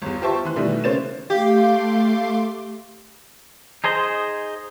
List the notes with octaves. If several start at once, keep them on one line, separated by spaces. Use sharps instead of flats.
G1 E2
F4 G4 C5 E5 A5 C#6
E3 C6 F#6
B2 D#3 E3 G3 A3 E4
C#3 A#3 C5 C#5 A6 E7
A3 G4 F5 C6 D6
D#4 G#4 C5 D#5